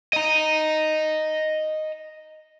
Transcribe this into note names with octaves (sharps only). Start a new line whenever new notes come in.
D#5 A#5